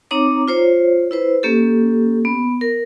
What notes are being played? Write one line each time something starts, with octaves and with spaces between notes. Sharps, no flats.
C4 D#4 C#5 A#5 D6
F4 C5 C#5
E4 B4 C5
A#3 C#4 G4 A4
B3
A#4